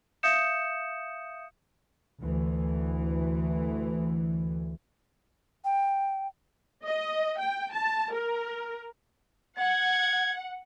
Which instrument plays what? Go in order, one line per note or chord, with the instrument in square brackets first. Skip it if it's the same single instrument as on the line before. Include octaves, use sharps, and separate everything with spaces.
[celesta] E5 F5 D#6 G6 C#7 E7
[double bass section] D2 E3
[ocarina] G5
[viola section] D#5
G5
A5
A#4
[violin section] F#5 [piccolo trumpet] G#6